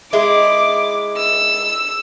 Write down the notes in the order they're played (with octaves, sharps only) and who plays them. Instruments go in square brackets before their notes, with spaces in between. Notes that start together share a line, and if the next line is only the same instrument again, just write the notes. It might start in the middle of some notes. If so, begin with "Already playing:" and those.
[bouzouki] G#3 E4 [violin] D6
[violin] E6